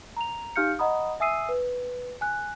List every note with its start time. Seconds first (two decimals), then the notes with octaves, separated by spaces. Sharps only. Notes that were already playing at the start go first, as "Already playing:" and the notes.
0.17 A#5 F7
0.56 D#4 G4 F5 F6 G6 C#7
0.79 D#5 F#5 A#5 B5 D#6
1.20 E5 G#5 D#6 E6 C7 D#7
1.49 B4
2.21 G#5 F#6